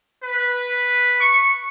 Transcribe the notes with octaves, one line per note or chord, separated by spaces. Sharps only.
B4
C#6